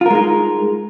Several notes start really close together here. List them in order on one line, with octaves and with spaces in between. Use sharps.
F4 A#4 G#3 D#4